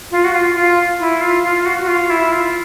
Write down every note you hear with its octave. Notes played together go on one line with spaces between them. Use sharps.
F4
F#4
F4
F4
E4
F4
F4
F#4
F#4
F4
E4
F4